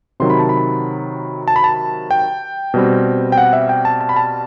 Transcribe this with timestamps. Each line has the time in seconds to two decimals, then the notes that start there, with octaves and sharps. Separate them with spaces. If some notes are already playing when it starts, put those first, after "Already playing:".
0.20 C3 D#3 F#3 C6
0.30 B5
0.39 A5
0.49 B5
1.48 A5
1.56 B5
1.64 A5
2.11 G5
2.74 B2 G3 C4
3.32 G5
3.38 F#5
3.53 E5
3.69 G5
3.85 A5
4.01 A5
4.09 B5
4.16 A5